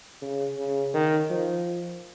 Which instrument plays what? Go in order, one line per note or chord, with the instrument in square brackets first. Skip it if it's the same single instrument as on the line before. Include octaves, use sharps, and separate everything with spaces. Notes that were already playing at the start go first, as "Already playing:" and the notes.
[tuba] C#3
C#3
D#3
F3